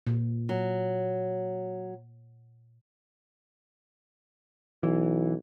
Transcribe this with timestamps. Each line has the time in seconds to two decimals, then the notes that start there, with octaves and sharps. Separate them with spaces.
0.07 A#2
0.49 F#3
4.83 B1 E3